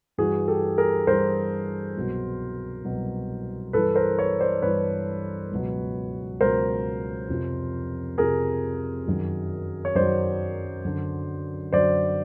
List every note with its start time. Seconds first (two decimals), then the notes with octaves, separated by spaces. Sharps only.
0.18 G2 E3 F#4 G#4
0.48 G4 A4
0.78 G#4 A#4
1.07 G2 E3 A#4 C5
1.96 C2 B2 F#3
2.85 C2 B2 F#3
3.73 G2 E3 A4 B4
3.95 A#4 C5
4.18 B4 C#5
4.40 C5 D5
4.62 G2 E3 B4 C#5
5.51 C#2 B2 F#3
6.40 C#2 B2 F#3 A#4 C5
7.29 F2 C3 F3
8.18 F2 C3 F3 G#4 A#4
9.07 F#2 D#3 F#3
9.85 C#5
9.95 F#2 D#3 F#3 C5 D5
10.84 F#2 D3 F#3
11.73 F#2 D3 F#3 C5 D5